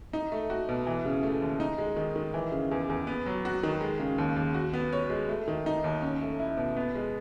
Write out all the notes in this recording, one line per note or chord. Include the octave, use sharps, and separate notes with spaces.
D#4
A3
F#4
B2
E3
C#3
A3
D#2
D#4
G#3
D#3
D#3
E3
C#3
E2
E2
B3
F#3
F#4
D#3
G#3
C#3
D#2
D#2
F#4
B3
C#5
G#3
A3
D#3
D#4
D#2
C#4
A3
E4
B2
B3
G#3